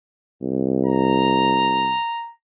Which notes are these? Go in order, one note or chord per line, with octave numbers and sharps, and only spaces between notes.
C2
A#5